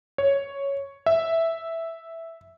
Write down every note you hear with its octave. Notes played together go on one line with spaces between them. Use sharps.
C#5
E5